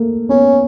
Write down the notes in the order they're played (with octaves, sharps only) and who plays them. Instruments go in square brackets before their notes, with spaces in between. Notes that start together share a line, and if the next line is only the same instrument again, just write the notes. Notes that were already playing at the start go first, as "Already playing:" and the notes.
Already playing: [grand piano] A3 A#3
[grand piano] B3 [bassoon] C#4